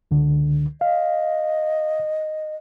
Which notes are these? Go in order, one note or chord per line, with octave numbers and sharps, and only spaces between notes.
C#2 D3
D#5 F5